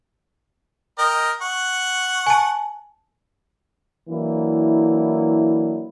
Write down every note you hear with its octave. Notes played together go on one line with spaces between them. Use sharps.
A#4 D#5 G5
F#5 C#6
G#5 A5
E3 F#3 A#3 D4 E4